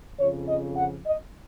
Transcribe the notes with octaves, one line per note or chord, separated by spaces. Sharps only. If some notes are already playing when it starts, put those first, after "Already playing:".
F2 C#3 F3 C#5
D#5
F#5
D#5